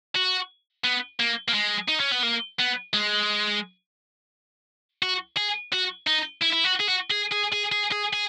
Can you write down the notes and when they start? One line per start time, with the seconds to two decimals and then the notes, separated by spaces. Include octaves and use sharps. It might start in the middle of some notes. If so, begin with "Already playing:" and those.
0.16 F#4
0.84 B3
1.20 A#3
1.48 A#3
1.54 G#3
1.89 D#4
2.00 C#4
2.12 B3
2.23 A#3
2.59 B3
2.93 G#3
5.03 F#4
5.37 G#4
5.73 F#4
6.07 D#4
6.42 E4
6.53 E4
6.65 F#4
6.80 G#4
6.88 F#4
7.11 G#4
7.32 G#4
7.53 G#4
7.72 G#4
7.92 G#4
8.13 G#4